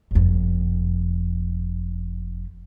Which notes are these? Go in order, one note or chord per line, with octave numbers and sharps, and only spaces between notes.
F#1 F2